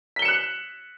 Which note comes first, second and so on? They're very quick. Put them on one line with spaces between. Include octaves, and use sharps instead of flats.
B6 G7 C#7 E7 F#6